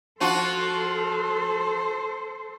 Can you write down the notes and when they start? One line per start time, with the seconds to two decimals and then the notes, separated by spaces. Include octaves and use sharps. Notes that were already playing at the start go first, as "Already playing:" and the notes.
0.20 F3 F4 F#4 A4 C5